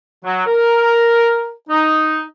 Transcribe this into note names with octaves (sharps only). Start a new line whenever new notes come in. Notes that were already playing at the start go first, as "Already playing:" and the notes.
F#3
A#4
D#4